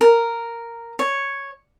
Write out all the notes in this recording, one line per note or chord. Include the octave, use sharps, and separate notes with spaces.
A#4
C#5